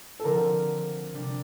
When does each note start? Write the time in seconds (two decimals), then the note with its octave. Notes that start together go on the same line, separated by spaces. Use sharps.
0.20 A4
0.24 D3 F3 C4 F4 A#4
1.13 C3 G3 D4